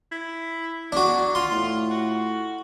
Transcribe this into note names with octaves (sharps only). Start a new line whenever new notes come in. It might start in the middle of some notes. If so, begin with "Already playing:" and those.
E4
F#3 D4 F#4
F4 C6
A2
F#4